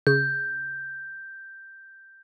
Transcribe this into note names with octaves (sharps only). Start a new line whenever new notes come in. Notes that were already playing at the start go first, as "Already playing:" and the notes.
C#3 G6